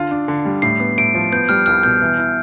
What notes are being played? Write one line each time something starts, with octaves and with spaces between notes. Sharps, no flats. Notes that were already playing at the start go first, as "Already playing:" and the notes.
Already playing: D3 F4
D4
D3
G3
A2 C7
B3
A2 D7
F3
B3 G6
G3 F6
C2 F6
B2 G6
E3
E4